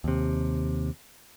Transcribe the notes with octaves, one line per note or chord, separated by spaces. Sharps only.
D#2 C3